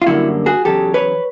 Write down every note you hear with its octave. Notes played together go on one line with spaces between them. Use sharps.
F4
F#2 D3 G3 A#3 E4 F#4
F#4 G#4
E2 C#3 F#3 G4 A4
B4 C#5